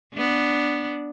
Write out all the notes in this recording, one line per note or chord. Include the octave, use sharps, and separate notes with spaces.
B3 D4